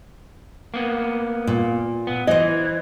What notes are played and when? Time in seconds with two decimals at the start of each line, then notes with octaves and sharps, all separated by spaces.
0.74 A#3 B3
1.47 A#2
2.07 B3
2.27 E3 C5 D#5